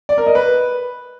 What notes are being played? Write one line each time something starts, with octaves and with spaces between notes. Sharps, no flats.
D5
A#4
D#5
B4